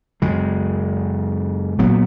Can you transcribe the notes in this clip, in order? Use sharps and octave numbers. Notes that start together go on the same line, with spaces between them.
F#2 C#3 G#3
A#2 F#3 B3